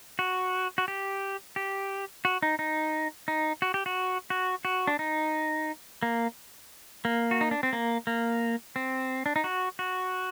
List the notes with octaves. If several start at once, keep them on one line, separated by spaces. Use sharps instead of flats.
F#4
F#4
G4
G4
F#4
D#4
D#4
D#4
F#4
G4
F#4
F#4
F#4
D4
D#4
A#3
A#3
F#4
D#4
D4
C4
A#3
A#3
C4
D4
D#4
F#4
F#4